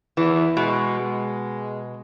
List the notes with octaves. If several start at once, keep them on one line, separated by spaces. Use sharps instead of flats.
E2 E3
B2 G#3
G#3